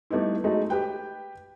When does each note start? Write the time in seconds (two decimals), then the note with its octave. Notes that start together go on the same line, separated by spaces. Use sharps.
0.10 G3 A3 B3 D#4 E4
0.44 F#3 G#3 A3 D#4
0.70 G4 B4 G5